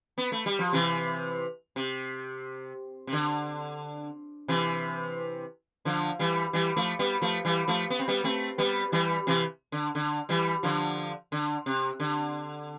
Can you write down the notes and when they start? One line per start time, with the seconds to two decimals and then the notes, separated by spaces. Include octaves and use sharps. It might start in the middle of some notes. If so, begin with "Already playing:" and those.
0.18 B3
0.32 A3
0.46 G3
0.59 F3
0.73 C3 E3
1.76 C3
3.07 C3
3.13 D3
4.48 C3 E3
5.85 D3 F3
6.19 E3 G3
6.53 E3 G3
6.76 F3 A3
6.99 G3 B3
7.22 F3 A3
7.45 E3 G3
7.68 F3 A3
7.90 B3
7.99 C4
8.08 G3 B3
8.24 A3 C4
8.58 G3 B3
8.92 E3 G3
9.27 C3 E3
9.72 D3
9.95 D3
10.29 E3 G3
10.63 D3 F3
11.32 D3
11.66 C3
12.00 D3